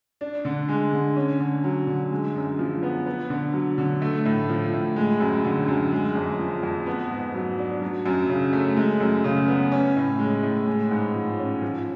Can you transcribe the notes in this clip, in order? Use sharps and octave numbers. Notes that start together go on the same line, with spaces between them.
D4
D3
G#3
D3
C#4
D3
F#3
D3
G#3
F#2
F3
B3
B3
D3
F#3
D3
A3
A2
F3
A2
G#3
F#2
D3
F#2
G#3
F2
F3
F2
B3
G#2
F#3
D4
F#3
F#2
C#3
A3
G#3
F#2
C#3
B3
C#4
A2
G#3
A2
G#3
G#2
F3
C#4
F3